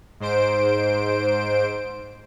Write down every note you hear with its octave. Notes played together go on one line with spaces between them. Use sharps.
G#2 C5 D7